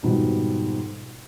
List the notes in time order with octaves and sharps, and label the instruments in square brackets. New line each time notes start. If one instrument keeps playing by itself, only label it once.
[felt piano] F2 G#2 B2 D#3 G3